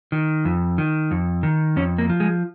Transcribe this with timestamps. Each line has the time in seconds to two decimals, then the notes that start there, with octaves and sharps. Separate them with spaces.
0.12 D#3
0.45 F2
0.78 D#3
1.11 F2
1.43 D#3
1.76 F2 C#4
1.98 A#3
2.09 F3
2.20 G#3